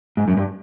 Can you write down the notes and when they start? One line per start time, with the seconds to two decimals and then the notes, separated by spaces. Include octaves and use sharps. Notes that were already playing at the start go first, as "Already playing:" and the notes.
0.17 G#2
0.28 F#2
0.37 G2